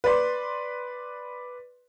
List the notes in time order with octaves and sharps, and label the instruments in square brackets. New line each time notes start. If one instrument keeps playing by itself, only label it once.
[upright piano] B4 D5 C6